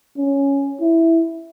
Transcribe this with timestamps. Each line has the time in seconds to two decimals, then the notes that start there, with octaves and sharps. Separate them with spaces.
0.17 C#4
0.80 E4